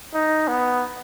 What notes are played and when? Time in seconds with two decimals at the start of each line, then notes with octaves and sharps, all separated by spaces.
0.14 D#4
0.48 B3